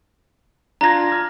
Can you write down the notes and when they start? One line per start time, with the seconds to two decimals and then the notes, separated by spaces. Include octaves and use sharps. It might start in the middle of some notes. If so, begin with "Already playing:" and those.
0.81 D4 F4 A#5 G#6 A#6
1.12 F6 G#6